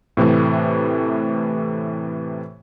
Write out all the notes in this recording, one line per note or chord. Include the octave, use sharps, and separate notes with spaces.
A2 C3 E3 A3